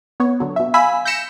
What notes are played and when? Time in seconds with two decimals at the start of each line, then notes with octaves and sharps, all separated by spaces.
0.20 B3 C#5
0.40 D3 F#3
0.56 B2 E5
0.74 F5 G#5 B5 E6 B6
1.05 G6 A#6 B6 C#7 E7